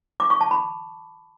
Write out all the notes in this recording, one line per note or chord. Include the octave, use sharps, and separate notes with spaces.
D6
C#6
A5
B5